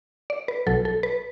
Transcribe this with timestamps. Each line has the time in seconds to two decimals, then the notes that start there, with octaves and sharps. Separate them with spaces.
0.30 D5
0.48 B4
0.67 B1 B2 F#3 A4
0.85 A4
1.03 B4